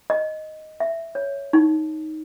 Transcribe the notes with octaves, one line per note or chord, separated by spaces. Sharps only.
D#5
E5
C#5
D#4